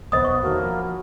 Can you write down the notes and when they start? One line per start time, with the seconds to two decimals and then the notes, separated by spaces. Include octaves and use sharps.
0.12 D#1 C2 F2 B3 C5 D#5 D#6
0.25 B1 C#6
0.42 E1 D#3 F#3 A3 A#3
0.63 F3 B5